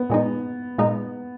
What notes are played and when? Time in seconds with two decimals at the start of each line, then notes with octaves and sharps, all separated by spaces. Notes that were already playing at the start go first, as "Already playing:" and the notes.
Already playing: B3
0.10 A#2 G#3 D#4
0.78 A#2 G#3 D#4